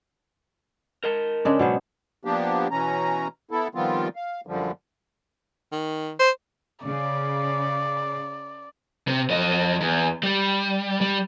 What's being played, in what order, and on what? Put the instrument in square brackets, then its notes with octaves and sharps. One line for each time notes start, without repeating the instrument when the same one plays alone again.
[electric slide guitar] A#4 D#5 A5
[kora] C#3 G#3 D4
[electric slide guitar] G#2 F#3 [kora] B2 B3 C5
[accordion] F3 A#3 B3 D4 G4
B2 E3 C#4 A#5
B3 E4 A4
D#3 F3 G3 B3 C4 F4
F5
F#2 D3 F3 G3
[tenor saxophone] D#3
C5
[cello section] C#3 [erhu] D5
[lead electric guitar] C3
F2 D#5
E2
G3
G3